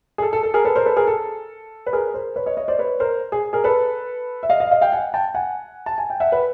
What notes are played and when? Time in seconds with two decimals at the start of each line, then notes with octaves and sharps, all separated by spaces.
0.18 G#4
0.22 A4
0.33 A4
0.43 A4
0.54 G#4 A#4
0.65 A4 B4
0.76 A#4 C5
0.86 A4 B4
0.97 G#4 A#4
1.07 A4
1.86 B4
1.93 G#4 A#4
2.14 A#4 C5
2.36 B4 C#5
2.46 C#5 D#5
2.57 C#5 D#5
2.68 C5 D5
2.79 B4 C#5
3.00 A#4 C5
3.32 G#4
3.53 G#4 A#4
3.64 A4 B4
4.43 E5
4.50 D#5 F5
4.60 D#5 F5
4.71 D#5 F5
4.81 F5 G5
4.92 F#5 G#5
5.14 G5 A5
5.34 F#5 G#5
5.86 A5
5.98 G#5
6.10 G5
6.20 E5 F#5
6.32 B4